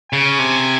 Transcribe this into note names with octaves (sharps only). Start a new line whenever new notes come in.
C#3 G#5
C3